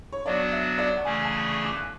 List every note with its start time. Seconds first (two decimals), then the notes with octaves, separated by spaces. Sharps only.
0.13 C#5
0.25 F#3 B3 D4 F#4 D5
0.52 E5
0.78 D5
0.96 F#5
1.05 C#3 E3 A3 C#4 G#4 G#5
1.25 A5
1.45 C#6
1.65 D6
1.76 F#6